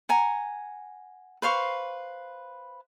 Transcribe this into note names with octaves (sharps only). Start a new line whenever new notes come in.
F#5 G#5 A#5
B4 C5 F5 C#6